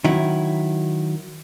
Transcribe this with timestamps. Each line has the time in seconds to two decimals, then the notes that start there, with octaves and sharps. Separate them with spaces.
0.04 D#3 F#3 E4